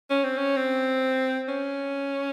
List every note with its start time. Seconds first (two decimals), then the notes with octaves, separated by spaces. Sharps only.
0.10 C#4
0.24 C4
0.37 C#4
0.56 C4
1.48 C#4